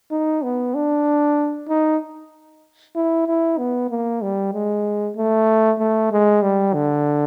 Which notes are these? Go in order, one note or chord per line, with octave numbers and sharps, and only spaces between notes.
D#4
B3
D4
D#4
E4
E4
B3
A#3
G3
G#3
A3
A3
G#3
G3
D3